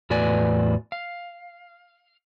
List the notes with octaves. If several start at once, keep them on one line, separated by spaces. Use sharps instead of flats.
E2 A2 F#4 B4 D5 G#5
F5